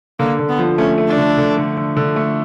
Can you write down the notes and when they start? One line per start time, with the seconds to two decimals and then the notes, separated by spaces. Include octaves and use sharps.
0.19 D3 A#3
0.39 D3
0.49 B3
0.59 F3
0.78 A3 C#4
0.98 A3
1.08 D4
1.18 D3
1.38 D3
1.58 D3
1.77 D3
1.97 D3
2.16 A3